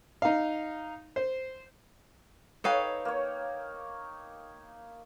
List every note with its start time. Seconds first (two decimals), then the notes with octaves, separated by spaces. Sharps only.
0.22 D#4 F5
1.16 C5
2.64 D#4 A4 B4 C#5 F5 G5
3.05 A#3 C#5